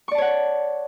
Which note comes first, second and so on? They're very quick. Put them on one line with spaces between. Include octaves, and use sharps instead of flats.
C#6 D5 A5 C#5 F#5